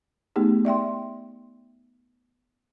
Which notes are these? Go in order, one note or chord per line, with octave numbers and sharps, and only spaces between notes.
A3 B3 D#4 G4 G#4
D5 E5 G5 C6